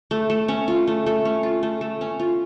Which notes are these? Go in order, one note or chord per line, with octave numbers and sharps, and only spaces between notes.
A3
A3
C#4
F4
A3
A3
C#4
F4
A3
A3
C#4
F4